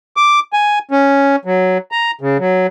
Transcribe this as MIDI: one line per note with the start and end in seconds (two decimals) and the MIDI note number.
0.17 0.40 86
0.53 0.79 80
0.91 1.36 61
1.45 1.78 54
1.92 2.11 82
2.21 2.38 49
2.39 2.67 54